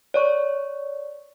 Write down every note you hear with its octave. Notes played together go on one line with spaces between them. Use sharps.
C#5 D5 C#6